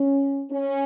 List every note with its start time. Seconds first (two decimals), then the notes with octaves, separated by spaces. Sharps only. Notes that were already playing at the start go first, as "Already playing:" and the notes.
Already playing: C#4
0.51 C#4